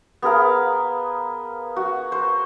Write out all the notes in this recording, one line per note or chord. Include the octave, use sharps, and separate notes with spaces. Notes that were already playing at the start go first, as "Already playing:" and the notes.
B3 G#4 A#4 F5
F#4
C5